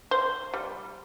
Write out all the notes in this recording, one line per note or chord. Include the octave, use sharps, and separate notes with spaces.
C5
G3